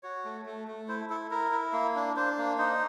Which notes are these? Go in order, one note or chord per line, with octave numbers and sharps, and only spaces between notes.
F#4 C#5
A3
A3
A3
E4 C5
E4 A4
E4 A#4
E4
A#3
D4
D4 C5
A#3
D#4 C5